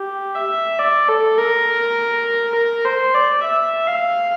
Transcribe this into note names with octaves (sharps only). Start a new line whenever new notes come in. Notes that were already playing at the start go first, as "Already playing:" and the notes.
Already playing: G4
E5
D5
A4
A#4
A#4
C5
D5
E5
F5